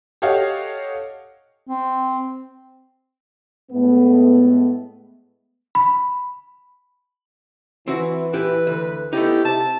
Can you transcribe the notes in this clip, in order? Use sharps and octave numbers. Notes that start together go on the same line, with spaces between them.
G4 A4 C#5 D#5 F5 F#5
C4
A2 G#3 A3 B3
B5
E3 C4 E4 F#4
A#2 E4 G4 B4
D2
A3 B3 D#4 E4 G4
C3 E5 A5